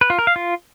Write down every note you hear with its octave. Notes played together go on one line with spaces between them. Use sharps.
B4
F4
A#4
F5
F4